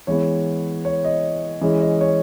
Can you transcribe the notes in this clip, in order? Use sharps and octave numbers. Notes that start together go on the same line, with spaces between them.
E3 G#3 B3 C#5
C#5
D#5
E3 G#3 C#4 D#5
D#5
C#5